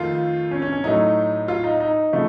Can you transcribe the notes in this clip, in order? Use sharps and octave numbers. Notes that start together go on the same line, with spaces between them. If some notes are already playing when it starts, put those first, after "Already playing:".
Already playing: F2 D#3 A3 F4
C#4
C#4
C#4
A2 F#3 A3 D#4
F4
D#4
D#4
C#3 F3 A3